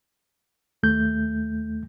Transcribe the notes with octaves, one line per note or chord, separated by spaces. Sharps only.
D#2 A3 G6